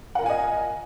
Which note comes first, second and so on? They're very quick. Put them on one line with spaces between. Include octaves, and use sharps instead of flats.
F#5 A#4 F4 G#5 D#5